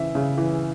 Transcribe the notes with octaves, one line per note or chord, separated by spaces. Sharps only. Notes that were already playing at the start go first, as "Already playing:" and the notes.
Already playing: C#3 E3 E5
C#3
E3